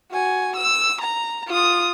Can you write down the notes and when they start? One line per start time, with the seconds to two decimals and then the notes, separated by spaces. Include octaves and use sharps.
0.11 F#4 G#5
0.56 E6
1.01 A#5
1.47 F4 D#6